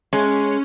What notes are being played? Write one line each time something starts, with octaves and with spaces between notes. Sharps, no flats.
G#3 C#4